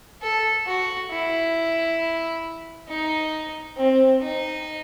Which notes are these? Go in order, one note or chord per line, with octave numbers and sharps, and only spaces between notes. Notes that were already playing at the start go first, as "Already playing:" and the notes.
A4
F#4
E4
D#4
C4
D#4